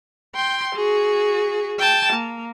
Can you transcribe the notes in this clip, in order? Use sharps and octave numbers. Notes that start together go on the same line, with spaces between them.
G5 C6
F#4 G#4
G5 A5
A#3